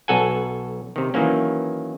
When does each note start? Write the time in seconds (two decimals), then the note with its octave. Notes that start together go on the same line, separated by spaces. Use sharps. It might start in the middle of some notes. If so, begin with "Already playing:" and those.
0.08 B1 F#4 A4 F#5 G#5
0.96 C3 D#3
1.14 D#3 E3 F#3 A#3 C#4